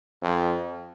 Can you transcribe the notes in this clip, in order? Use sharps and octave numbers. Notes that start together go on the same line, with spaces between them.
F2